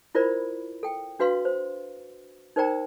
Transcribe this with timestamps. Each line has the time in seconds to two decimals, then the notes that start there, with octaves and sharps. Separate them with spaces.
0.15 E4 F4 A#4 C5 D5 B5
0.83 A4 G5
1.19 D4 F#4 B4 F5 C6
1.45 C5
2.56 D#4 A#4 C5 D5 G5 A#5